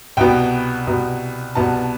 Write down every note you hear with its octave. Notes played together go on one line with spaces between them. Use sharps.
C2 B2 B3 G5
C2 B2 B3
C2 B2 B3 A5